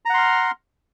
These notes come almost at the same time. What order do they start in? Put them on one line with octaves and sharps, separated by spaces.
A#5 F#5 C6 F6